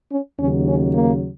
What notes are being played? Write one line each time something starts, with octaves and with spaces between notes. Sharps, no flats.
C#4
D#2 C#3 F#3 C#4
C#4
A#3